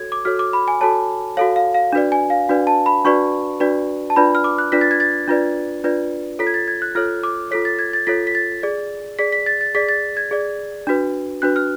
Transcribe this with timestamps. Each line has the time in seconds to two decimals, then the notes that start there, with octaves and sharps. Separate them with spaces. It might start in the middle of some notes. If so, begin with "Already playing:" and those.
Already playing: F#4 A4 C#5 G#6
0.12 D6
0.25 F#4 A4 C#5 F6
0.39 D6
0.53 B5
0.68 G#5
0.81 F#4 A4 C#5 A5
1.37 F#4 A4 C#5 F5
1.56 F5
1.74 F5
1.93 D4 F#4 B4 D5
2.12 G#5
2.30 F5
2.49 D4 F#4 B4 D5
2.67 A5
2.86 B5
3.05 D4 F#4 B4 D5 C#6
3.60 D4 F#4 B4 D5
4.10 A5
4.16 D4 F4 B4 D5 B5
4.35 F6
4.44 D6
4.58 F#6
4.72 D4 F4 B4 D5 B6
4.81 A6
4.91 G#6
5.00 A6
5.28 D4 F4 B4 D5
5.84 D4 F4 B4 D5
6.39 F4 A4 C#5 B6
6.47 G#6
6.54 A6
6.68 G#6
6.82 F#6
6.95 F4 A4 C#5 F6
7.23 D6
7.51 F4 A4 C#5 B6
7.65 A6
7.79 G#6
7.93 A6
8.07 F4 A4 C#5 B6
8.27 B6
8.35 A6
8.63 G#4 D5
9.19 G#4 D5 B6
9.32 B6
9.46 A6
9.61 A6
9.75 G#4 D5 B6
9.89 A6
10.17 G#6
10.31 G#4 D5
10.87 D4 F#4 B4
11.42 D4 F#4 B4 F#6
11.56 F6